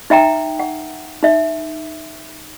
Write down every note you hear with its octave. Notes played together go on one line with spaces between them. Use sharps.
D#4 E5 G5 A#5
F#5
D#4 E5